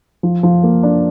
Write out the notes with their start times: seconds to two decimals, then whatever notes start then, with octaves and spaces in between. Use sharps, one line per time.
0.23 F3
0.43 F3
0.63 A#3
0.83 D4